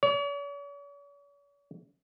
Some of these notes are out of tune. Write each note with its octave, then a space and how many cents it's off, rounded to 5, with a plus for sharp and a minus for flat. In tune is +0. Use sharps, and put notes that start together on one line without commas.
C#5 +45